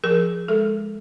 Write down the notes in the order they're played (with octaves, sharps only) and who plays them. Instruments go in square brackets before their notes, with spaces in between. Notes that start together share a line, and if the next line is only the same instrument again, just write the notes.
[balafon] F3 G#4 A#4
G#3 A4